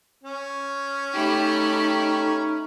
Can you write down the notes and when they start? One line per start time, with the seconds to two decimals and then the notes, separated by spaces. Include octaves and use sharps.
0.23 C#4
1.13 A3 D#4 G4 B5